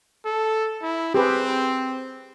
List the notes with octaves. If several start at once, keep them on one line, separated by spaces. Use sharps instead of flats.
A4
E4
C4 G4 G#4 B4